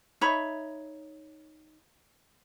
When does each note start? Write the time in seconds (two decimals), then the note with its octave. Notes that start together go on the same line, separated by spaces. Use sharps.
0.21 D#4 C#5 E5 B5